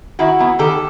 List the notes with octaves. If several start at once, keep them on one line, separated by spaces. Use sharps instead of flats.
D#3 E4 F#4
F#3 B3
D#3 G4 A4